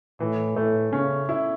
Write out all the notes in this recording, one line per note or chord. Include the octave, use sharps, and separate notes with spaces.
A2 E3
A2 A3
C#3 C#4
E4